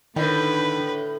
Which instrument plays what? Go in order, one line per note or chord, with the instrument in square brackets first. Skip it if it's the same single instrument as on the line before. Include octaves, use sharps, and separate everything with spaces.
[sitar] A2 [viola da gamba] D3 [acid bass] D#3 [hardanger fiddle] B4